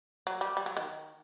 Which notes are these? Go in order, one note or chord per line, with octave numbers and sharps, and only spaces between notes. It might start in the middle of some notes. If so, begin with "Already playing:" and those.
F#3
G3
G3
F#3
D#3